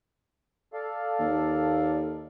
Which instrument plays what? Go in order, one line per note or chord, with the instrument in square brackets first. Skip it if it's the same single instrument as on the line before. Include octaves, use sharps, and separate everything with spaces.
[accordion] A4 D5 F5
[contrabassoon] D#2